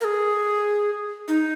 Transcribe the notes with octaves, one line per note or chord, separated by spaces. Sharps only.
A#4
G#4
D#4